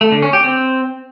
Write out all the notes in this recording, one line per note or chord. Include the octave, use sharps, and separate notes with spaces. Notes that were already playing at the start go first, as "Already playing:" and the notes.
A3
D3
C#4
G4
C4